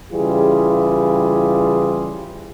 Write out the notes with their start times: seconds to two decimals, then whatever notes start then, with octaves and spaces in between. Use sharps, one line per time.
0.12 C#3 E3 G3 F4 G#4